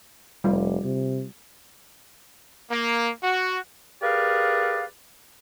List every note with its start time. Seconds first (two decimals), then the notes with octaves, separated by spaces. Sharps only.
0.44 F1 G3 F4
0.84 C3
2.71 A#3
3.24 F#4
4.02 G4 G#4 A#4 B4 D5 F5